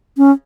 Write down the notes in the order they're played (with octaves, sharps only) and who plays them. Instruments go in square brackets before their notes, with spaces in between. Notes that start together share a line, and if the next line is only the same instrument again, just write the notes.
[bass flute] C#4